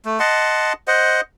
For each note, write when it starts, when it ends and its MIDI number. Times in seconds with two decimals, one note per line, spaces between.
0.05 0.19 57
0.20 0.73 75
0.20 0.73 78
0.20 0.73 81
0.20 0.73 84
0.88 1.21 72
0.88 1.21 75
0.88 1.21 78